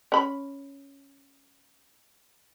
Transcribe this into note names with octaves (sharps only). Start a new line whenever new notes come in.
C#4 B5